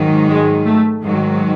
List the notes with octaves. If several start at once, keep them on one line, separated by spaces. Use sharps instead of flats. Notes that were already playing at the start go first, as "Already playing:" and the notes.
Already playing: G#2 D#3 F#3
G#3
A3
G#2 D#3 F#3